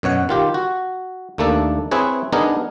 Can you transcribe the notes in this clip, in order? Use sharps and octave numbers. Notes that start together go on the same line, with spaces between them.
F#2 B2 C#5 F#5
D#3 F4 G4
F#4
D#2 A3 A#3 D4 A4
C4 E4 G#4 B4 C#5
B3 D4 D#4 G#4 A#4